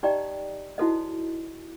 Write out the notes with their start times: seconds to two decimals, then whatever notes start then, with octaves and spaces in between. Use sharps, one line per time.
0.03 D#4 G4 D5 D#5 G5 A#5
0.78 D#4 E4 F#4 A4 C5 D#5